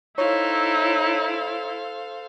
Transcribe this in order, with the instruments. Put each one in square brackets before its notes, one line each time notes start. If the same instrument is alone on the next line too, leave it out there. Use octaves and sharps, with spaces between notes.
[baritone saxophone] D#4 [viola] E4 [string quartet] A4 C5 F5 [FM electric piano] C#5